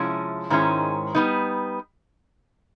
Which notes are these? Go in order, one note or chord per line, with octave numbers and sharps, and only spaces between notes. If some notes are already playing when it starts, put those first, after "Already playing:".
Already playing: C3 F3 G#3 C#4 E4
G#2 D#3 G#3 C#4 E4
G3 B3 D#4